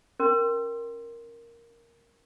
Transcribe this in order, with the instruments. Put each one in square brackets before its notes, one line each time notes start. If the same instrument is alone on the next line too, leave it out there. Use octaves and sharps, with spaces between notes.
[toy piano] C#4 A#4 C6